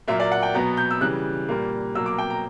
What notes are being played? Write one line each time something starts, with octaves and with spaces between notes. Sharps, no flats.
A#2 F#3 A#3 E5
D5
F#5
G5
B2 F#3 B3 A#5
G6
E6
C#3 E3 G3 F#6
A#2 G3 A#3
B2 F#3 A#3 E6
D6
G5
A#5